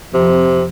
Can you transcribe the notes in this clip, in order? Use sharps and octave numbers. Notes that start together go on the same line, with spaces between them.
F2 C3